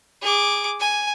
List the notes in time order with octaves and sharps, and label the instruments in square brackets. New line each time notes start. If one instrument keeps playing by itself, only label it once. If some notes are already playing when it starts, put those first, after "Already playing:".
[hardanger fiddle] G#4 D6
G#5